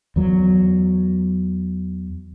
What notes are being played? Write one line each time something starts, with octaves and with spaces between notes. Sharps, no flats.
E2 F#3